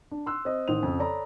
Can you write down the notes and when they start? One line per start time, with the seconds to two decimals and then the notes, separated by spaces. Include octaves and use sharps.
0.11 D4
0.26 C6 E6 F#6
0.45 C4 D#5
0.68 A1 D#3 C5 D#6 F7
0.83 F2 C#3
0.99 A4 C#5 D5 A#5 B5